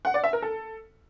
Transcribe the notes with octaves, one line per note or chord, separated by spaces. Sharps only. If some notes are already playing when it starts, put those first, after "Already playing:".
F#5
D5
E5
A#4
A4